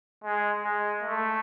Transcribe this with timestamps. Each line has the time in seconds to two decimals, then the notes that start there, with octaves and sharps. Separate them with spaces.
0.24 G#3
0.63 G#3
1.03 A3